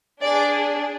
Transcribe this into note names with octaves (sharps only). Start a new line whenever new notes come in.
D4 G#4 D5